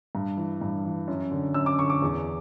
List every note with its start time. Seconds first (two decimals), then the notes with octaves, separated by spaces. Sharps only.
0.15 G2
0.37 E3
0.61 G2
0.85 E3
1.08 F#2
1.31 D3
1.54 F#2 E6
1.66 D6
1.79 D3 C#6
1.90 D6
2.02 E2